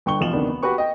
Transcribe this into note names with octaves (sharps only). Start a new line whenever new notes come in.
G1 G5 C#6 G7
A1 B2 F3 E4 E7 F#7
D2 C3 D#3 B3 D4
B3
F#4 G4 B4 C#6
D#5 G5